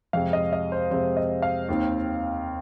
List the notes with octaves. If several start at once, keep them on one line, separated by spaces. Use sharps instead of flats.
F2 C3 G#3 C4 F5
D#5
D#5
C5
F2 C3 G#3 C4 C5
D#5
F5
D#2 D#3 C4